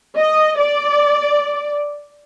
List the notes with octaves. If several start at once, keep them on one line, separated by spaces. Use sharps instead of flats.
D#5
D5